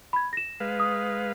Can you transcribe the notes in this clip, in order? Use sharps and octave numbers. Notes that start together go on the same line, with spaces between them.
B5 G#6
A#6 E7
G#3 B4 F5
D#6